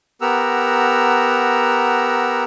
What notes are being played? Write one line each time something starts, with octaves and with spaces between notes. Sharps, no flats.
B3 G4 A#4 F#5 A#5 E6